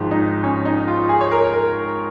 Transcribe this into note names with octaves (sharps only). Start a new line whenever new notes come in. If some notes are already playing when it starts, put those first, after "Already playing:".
Already playing: G#1 G#2 F3
D#4
C#4
D#4
F4
G#4
C#5
A#4
A#4